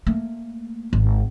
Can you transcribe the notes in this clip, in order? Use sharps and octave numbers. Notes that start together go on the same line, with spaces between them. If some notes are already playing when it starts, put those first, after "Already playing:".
A3 A#3
G#1